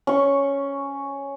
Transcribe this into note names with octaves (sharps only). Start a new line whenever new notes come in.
C#4 C#6